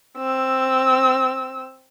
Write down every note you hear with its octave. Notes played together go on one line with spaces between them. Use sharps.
C4 E6